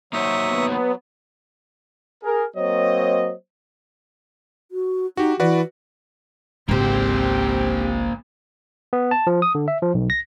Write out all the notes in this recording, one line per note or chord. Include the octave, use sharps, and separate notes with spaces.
F#3 A#3 D#4 C5 E5 C#6 D#6
B3
G#4 A#4
F#3 A#3 C4 C5 C#5 D#5
F#4
D#4 F#4 G4
E3 F#4 B4 D5
G#1 C#2 A#3 C4 G4 C5
B3
A5
F3
D#6
D3
E5
F3
B1
A#6